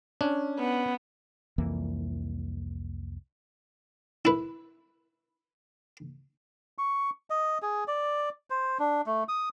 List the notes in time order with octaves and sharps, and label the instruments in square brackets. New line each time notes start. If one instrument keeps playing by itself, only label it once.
[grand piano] C#4 [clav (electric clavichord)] D4
[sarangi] B3
[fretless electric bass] C2 F2 E3 A#3
[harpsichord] E4 B4
[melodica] C#6
D#5
G#4
D5
C5
D4
A3
D#6